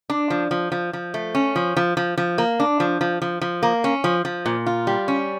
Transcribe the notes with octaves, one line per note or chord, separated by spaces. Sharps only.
D4
F3
F3
F3
F3
A3
C#4
F3
F3
F3
F3
A#3
D4
F3
F3
F3
F3
A#3
C#4
F3
F3
A#2
F4
G3
C#4